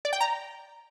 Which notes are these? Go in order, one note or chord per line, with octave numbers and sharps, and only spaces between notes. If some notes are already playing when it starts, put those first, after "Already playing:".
D5
G5
A#5